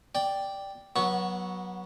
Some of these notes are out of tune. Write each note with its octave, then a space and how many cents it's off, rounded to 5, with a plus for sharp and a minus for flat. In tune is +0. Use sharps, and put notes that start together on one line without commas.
D5 +0 G5 +0
F#3 +0 B3 -25 C#6 +0